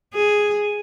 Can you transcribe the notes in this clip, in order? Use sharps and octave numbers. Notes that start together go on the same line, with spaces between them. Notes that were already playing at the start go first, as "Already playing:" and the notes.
G#4